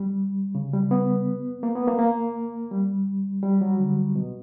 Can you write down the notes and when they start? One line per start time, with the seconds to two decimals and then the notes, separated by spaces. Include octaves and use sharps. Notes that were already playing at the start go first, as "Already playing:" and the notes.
Already playing: G3
0.55 C#3
0.74 G3
0.91 B3
1.63 A#3
1.76 B3
1.87 A#3
1.99 A#3
2.71 G3
3.43 G3
3.61 F#3
3.79 D3
4.16 B2